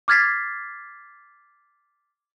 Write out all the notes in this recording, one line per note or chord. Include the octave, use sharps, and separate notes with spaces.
D6 F6 G#6 A6 B6 C7